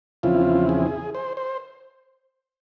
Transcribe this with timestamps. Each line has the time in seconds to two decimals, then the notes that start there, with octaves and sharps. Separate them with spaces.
0.23 E2 C#3 F3 C4 E4 F4
0.69 G#4
1.15 C5
1.37 C5